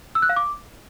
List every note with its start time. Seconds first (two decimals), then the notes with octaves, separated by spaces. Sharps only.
0.15 E6
0.22 F#6
0.29 F5
0.36 D6